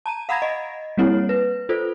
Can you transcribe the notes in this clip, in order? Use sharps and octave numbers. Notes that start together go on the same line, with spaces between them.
A5 A#5 D#7
F5 F#5 A#5 B5 G#6 A#6
D#5
G3 A#3 C4 E4 C#5
B4
F4 A4 C5